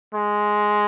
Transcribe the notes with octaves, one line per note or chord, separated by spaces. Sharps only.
G#3